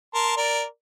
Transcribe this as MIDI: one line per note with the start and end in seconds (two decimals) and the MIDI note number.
0.14 0.35 70
0.14 0.35 81
0.14 0.35 84
0.37 0.64 70
0.37 0.64 74